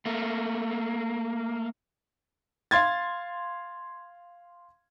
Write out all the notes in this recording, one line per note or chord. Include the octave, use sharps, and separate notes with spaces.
A3 A#3
F5 C6 G#6 A6